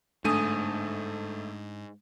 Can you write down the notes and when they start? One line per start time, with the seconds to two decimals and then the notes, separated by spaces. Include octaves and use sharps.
0.24 G1 G#2 A3 D4 G#5 D#6 D#7